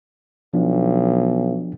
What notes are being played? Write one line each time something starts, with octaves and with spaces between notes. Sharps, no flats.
B1 F3 B3 D4